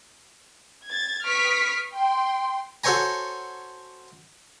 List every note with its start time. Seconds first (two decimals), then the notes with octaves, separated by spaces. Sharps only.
0.87 G#6 A6
1.25 B4 C#6 D#6 F6 B6 D7
1.94 G5 C6
2.84 F#4 A4 C5 C#5 G#5 A#5